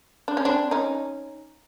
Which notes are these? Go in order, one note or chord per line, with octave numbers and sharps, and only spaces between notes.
D4
C#4
C4 D4
C#4 D#4